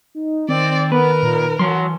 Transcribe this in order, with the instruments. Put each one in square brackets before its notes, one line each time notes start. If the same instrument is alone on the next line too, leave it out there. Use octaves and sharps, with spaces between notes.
[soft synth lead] D#4
[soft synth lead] D#3 [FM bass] C4 [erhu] D5
[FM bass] B3 [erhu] A#4 [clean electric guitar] B4
[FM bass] A#2
[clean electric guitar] E3 C6 [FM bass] F#3